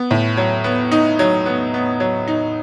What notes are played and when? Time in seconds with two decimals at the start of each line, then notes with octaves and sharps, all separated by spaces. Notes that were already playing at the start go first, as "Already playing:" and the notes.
Already playing: B3
0.11 A2
0.37 F#3
0.64 B3
0.91 D#4
1.19 F#3
1.46 B3
1.74 B3
2.00 F#3
2.28 D#4